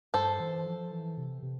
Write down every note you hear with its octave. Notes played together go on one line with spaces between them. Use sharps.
G2 A4 C5
E3
F3
E3
C3
C3